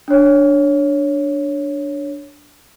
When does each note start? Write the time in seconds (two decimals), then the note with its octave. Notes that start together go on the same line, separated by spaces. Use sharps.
0.08 D4 C#5